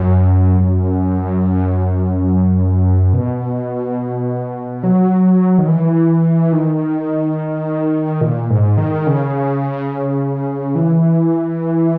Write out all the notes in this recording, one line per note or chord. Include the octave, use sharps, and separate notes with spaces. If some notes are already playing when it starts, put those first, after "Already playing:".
Already playing: F#2
F#2
B2
F#3
D#3
E3
D#3
A#2
G#2
D#3
C#3
E3